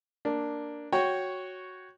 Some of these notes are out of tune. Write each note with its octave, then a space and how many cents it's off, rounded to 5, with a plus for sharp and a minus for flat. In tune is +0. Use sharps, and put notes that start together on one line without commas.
A#3 +0 D4 +0
F#4 +0 C#5 +0 G5 +0